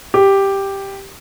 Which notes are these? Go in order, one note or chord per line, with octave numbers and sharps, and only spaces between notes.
G4